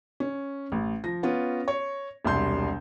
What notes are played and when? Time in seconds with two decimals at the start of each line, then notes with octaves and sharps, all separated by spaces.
0.20 C#4
0.72 A1
1.04 F3 A#6
1.23 B3 C#4 F4
1.68 C#5
2.25 E1 C2 G3 C6 G6